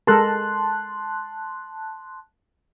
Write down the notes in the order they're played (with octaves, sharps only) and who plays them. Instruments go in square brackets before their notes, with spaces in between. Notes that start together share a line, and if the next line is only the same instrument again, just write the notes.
[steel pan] G#3 A4 A#4 [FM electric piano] A5 C6 F#6